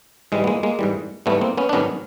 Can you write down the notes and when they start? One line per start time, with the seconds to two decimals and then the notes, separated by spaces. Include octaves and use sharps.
0.32 G#2 E3 G3 G#3
0.44 B3
0.47 G#3 A#3
0.63 G#3 A#3
0.79 G#2 E3 G3
1.26 G#2 E3 G3 A3 B3
1.41 A#3 C4
1.58 B3 C#4
1.69 D4
1.73 G#2 D#3 F#3 B3 C#4